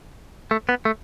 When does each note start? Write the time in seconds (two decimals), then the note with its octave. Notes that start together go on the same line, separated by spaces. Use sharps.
0.51 A3
0.69 B3
0.85 A3